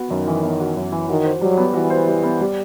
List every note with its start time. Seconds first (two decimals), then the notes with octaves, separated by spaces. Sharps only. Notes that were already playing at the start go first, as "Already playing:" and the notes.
Already playing: B3 F#4
0.09 F#2 D#3
0.27 E3
0.43 B3
0.60 F#4
0.76 F#2
0.92 E3
1.08 D#3 F#4
1.25 C5
1.41 F#3 G3
1.57 B3
1.74 E3 F#4
1.90 C5
2.07 G3
2.23 B3
2.40 G3